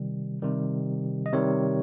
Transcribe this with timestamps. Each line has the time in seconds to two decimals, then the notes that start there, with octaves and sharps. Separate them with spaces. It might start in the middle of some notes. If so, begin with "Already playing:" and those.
Already playing: C3 D#3 G3
0.42 C3 D#3 G3
1.26 D#5
1.32 C3 D#3 G3 C#5